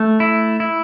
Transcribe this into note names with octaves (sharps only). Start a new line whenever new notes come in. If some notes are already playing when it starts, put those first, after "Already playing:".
Already playing: A3
E4
E4